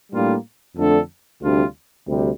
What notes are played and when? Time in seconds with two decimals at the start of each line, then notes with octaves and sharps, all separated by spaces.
0.12 A2 G3 A#3 D4 F4
0.76 F2 D3 A3 D4 A4
1.41 D2 C3 G3 D4 F4
2.06 D2 C3 G3